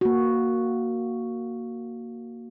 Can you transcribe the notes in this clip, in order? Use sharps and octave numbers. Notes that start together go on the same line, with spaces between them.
A#3 F#4